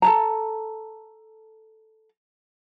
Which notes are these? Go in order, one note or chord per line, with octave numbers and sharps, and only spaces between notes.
A4 A5 A#5